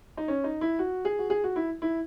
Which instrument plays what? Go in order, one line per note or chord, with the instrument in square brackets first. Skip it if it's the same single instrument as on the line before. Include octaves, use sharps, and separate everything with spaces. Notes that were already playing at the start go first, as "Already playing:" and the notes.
[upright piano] D#4
C#4
D#4
E4
F#4
G#4
F#4
G#4
F#4
E4
E4